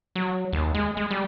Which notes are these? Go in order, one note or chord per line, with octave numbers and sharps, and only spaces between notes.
F#3
D#2
G#3
G#3
G3